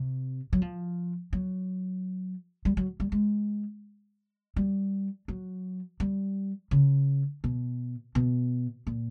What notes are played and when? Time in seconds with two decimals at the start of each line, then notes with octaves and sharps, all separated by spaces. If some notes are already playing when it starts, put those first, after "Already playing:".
Already playing: C3
0.53 F#3
0.62 F3
1.33 F#3
2.65 G3
2.77 F#3
3.00 G3
3.12 G#3
4.56 G3
5.28 F#3
6.00 G3
6.71 C#3
7.44 B2
8.15 B2
8.87 A#2